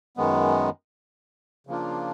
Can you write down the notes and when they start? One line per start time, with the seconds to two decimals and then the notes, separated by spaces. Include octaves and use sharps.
0.17 F#2 D#3 G#3 B3
1.67 C#3 F3 A#3 D4 F4